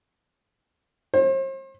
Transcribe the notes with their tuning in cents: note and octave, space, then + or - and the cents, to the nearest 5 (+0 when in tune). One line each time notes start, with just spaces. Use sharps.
C5 +40